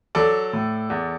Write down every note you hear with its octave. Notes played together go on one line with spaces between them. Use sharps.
F#3 A4 D5
A2
E2